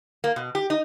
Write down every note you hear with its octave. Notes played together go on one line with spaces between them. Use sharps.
A#3
B2
G4
D#4